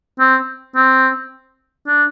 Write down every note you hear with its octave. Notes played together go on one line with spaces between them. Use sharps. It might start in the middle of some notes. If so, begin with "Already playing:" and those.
C4
C4
D4